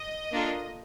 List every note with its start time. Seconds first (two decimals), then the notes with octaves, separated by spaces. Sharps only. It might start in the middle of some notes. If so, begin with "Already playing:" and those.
Already playing: D#5
0.32 A#3 D4 F4 A4